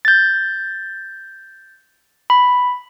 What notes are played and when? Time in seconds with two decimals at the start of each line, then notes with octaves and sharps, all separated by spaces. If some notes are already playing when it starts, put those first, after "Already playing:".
0.05 G6 A6
2.30 B5